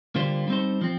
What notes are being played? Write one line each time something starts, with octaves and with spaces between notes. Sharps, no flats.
D3 G3 A#3 F4 C5
G3 C4 D#4 A4 C5
F3 C4